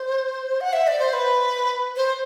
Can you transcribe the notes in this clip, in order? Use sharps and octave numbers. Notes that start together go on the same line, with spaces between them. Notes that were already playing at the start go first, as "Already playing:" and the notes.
Already playing: C5
F#5
E5
D5
C5
B4
C5